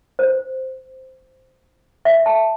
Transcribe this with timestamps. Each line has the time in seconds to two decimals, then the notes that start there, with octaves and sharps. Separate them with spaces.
0.19 C5
2.05 E5
2.26 A5